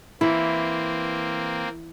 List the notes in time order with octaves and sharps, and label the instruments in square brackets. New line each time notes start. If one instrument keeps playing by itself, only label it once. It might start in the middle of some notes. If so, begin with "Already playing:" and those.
[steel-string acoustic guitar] E3 [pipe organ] A#3 C4 [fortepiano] E4